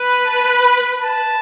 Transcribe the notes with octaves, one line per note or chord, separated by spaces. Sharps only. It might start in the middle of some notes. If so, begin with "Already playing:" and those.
Already playing: B4
A5
B5
A5